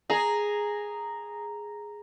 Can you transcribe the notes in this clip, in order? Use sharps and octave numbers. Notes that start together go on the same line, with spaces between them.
G#4 A#5